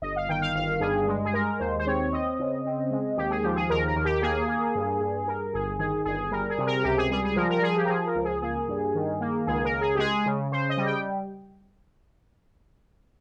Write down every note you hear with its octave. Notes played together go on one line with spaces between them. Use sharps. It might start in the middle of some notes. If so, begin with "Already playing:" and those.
G1 D#5
F5
D#3 G5
F5
G1 F5
G2 G#4
G#3
G#4
G#3 A#4
D#2 C5
C5
C4 C#5
C4 D#5
C#3
C4
G#3
D#2 G4
G#4
F3 G4
G#4
D#2 A#4
A#4
D#2
G4
A#3 G#4
A#3
G2
G2
G2 A#4
G1 G#4
D#3 G#4
G1 G#4
G3 A#4
G#4
C3
A#4
C#2 G4
G#4
G3 G#4
G#4
F3 A#4
A#4
F3 G#4
G4
A#4
F3 G#4
A#4
C#2
G#4
A#3 G#4
G2
D#3
A#3
C#2 G#4
A#4
C#2
G#4
G4
G#3 G#4
C#3
C#3 C5
D#5
G3
G5